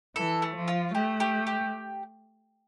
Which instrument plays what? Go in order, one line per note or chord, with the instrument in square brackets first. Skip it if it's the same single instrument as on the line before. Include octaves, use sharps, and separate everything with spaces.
[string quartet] E3 [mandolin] A4
[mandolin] A3
[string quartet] F3
[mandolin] F4
[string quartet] A3 [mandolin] G4
[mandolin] G4
G4